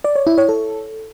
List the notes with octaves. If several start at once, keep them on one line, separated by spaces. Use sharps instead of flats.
D5
C#5
E4
C#5
A4